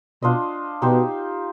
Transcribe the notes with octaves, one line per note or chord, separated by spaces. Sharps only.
B2 D4 F4 C5 D#5
B2 D#4 G4 C5